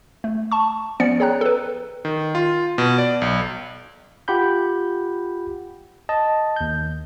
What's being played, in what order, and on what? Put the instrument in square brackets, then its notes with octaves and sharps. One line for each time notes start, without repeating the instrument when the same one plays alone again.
[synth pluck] A3
A5 C#6
F3 B3 C#4 D5 C#7
G#4 C#5 G5 A#5 F#6
A4 B4
[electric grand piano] D#3
F4
B2
D5
B1
[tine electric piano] F4 G4 F#5 B5 G6
D#5 A5
D#2 G6